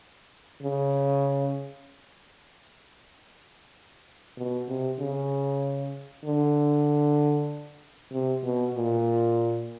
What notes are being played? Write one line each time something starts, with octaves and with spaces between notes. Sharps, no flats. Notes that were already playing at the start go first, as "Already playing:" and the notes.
C#3
B2
C3
C#3
D3
C3
B2
A#2